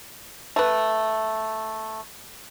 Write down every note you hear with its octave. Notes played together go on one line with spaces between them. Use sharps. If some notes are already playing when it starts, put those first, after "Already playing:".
A3 B4